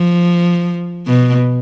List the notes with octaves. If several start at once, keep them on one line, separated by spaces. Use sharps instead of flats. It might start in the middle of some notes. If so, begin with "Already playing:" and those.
Already playing: F3
B2